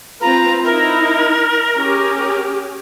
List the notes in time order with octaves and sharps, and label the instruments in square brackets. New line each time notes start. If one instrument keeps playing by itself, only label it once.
[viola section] C4 F4 B4 [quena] A#5
[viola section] D#4 E4 [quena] A#4
[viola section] C#4 G4 G#4